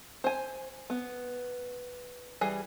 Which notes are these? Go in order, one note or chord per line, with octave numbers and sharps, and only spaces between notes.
C5 G#5
B3
E3 G3 G#4 G#5